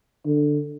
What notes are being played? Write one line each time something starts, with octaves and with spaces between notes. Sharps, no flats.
D3